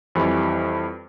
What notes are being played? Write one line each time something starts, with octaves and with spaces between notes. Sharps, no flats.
F2 E3 G3